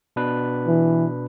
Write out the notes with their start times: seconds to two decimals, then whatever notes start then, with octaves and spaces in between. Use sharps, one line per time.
0.16 B2 D4 B4
0.67 E3